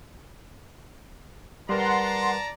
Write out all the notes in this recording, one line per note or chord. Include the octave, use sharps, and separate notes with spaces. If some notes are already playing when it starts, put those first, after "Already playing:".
G3 A#4 B4 D5 F#5 A5 A#5 C6